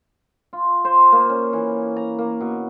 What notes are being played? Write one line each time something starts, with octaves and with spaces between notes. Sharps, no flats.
F4
C5
A#3
C#4
E3
A#5
A#3
B2